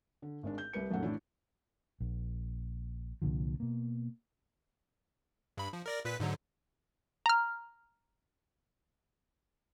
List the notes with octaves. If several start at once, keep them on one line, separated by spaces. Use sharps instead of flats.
D3
G#1 G#3 D4
G6
C2 G3 B4 C#7
B1 F#2 A#2 A3 F#5
A2 E3 D4 E4
A#1
C2 A#2 D3 F3
B2 A#3
G2 B5
F3
A#4 D5 A#6
A#2 B4 B6
G#2 D3 F#3
A#5 F6